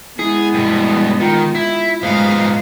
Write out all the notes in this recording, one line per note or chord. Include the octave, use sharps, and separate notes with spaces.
G#3 B3 E4 G#4
G2 B2
D#3 F4
E4
G#2 G#3 B3 F5